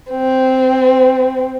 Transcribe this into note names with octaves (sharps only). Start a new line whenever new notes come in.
C4